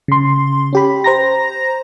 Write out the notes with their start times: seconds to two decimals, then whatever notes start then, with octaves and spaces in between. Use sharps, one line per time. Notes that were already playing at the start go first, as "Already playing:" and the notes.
0.08 C#3 C6
0.73 C#4 G4 B5
1.04 C5 A#5 A#6